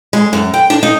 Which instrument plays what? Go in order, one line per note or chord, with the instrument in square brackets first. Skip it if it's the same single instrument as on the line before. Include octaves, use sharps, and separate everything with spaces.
[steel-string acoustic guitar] G#3
F#2
G5
D4
D#4